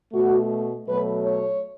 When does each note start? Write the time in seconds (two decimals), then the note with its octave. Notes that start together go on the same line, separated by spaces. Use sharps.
0.13 B2 A3 F#4
0.87 B2 F#3 A3 B4
1.25 C#5